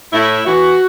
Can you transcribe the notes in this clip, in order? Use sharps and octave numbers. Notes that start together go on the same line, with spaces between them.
A2 E4
E3 F#4